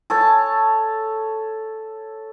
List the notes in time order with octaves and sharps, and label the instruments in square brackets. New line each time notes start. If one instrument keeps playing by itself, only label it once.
[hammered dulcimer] A4 C#5 A5